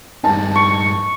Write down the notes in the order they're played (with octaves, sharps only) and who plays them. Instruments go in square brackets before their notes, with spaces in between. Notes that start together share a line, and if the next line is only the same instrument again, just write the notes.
[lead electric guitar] G2 D#4 [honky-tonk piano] A5
[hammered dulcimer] C#6